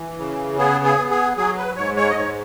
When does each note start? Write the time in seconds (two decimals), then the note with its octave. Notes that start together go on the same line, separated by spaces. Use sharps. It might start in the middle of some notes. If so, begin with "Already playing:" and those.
Already playing: E3
0.19 C#3
0.58 B3 G#4
0.85 G#4
0.98 B3
1.11 G#4
1.37 F#3 G#4
1.57 B4
1.77 G#2 C#5
1.97 C#5
2.10 D#5
2.16 G#2 C#5